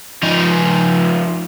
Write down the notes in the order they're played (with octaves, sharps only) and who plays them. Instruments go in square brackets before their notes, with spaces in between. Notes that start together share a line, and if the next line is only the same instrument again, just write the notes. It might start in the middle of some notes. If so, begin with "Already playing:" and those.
[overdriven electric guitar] F3 D#4